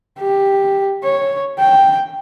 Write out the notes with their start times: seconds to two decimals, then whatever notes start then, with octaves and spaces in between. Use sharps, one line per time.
0.19 G4
1.04 C#5
1.59 G5